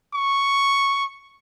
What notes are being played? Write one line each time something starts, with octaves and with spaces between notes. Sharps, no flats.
C#6